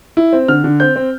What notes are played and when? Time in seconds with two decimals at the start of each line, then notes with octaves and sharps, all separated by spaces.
0.17 E4
0.33 C4
0.48 D3 F6
0.64 D3
0.80 C4 G6
0.96 C4